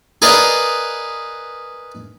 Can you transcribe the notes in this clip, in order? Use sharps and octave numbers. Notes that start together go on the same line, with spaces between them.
G#4 A#4 B4 D5 D#5 F5